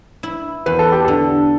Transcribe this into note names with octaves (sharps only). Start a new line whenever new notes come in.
E4
E2 B4
A4
G4
D3 A4